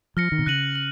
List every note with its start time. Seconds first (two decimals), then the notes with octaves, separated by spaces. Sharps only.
0.17 F3 F6 A#6 C#7
0.32 D#3
0.39 B2
0.46 C#3 F#6 A#6 D#7 F#7
0.76 F#7